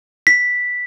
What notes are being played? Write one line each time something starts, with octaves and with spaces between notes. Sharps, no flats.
B6